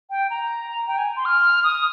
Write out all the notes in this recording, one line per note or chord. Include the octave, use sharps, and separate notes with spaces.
G5
A#5
G5
G#5
C6
F6
D#6